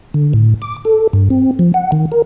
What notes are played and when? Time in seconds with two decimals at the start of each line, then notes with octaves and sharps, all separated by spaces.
0.14 D3
0.33 A2
0.62 D6
0.85 A4
1.13 G2
1.30 C4
1.59 F3
1.74 F#5
1.92 D#3
2.12 A#4